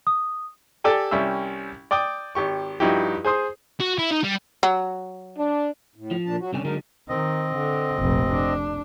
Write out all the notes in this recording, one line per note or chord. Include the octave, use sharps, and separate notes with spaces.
D#6
G4 A4 D5 G5 G#5
C2 G3 C#4 E5 E6
D5 G5 D6 D#6
G#1 G4 C#6
G2 F3 D#4 E4 F#4 G4
G#4 C5 C6 D#6
F#4
E4
D#4
G3
F#3
D4
A2
F3
A#2 D4 A5
F#3 F#4
C2 D3 C#4 G#5
D3 F#3 G#3 D#4 A#4
D#3 C4 D#5
D3
F1 A#1
D4